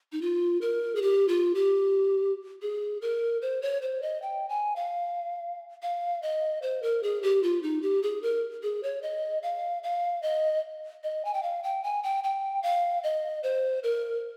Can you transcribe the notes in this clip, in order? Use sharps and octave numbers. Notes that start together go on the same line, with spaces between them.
D#4
F4
A#4
G#4
G4
F4
G4
G#4
A#4
C5
C#5
C5
D#5
G5
G#5
F5
F5
D#5
C5
A#4
G#4
G4
F4
D#4
G4
G#4
A#4
G#4
C#5
D#5
F5
F5
D#5
D#5
G#5
G5
F5
G5
G#5
G5
G5
F5
D#5
C5
A#4